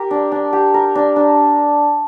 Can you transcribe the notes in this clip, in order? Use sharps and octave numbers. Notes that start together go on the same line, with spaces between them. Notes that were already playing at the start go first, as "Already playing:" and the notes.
Already playing: G4 A#4
D4
D4
G4
A#4
D4
D4